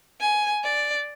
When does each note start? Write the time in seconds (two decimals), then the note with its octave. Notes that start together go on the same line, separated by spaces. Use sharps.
0.20 G#5
0.64 D5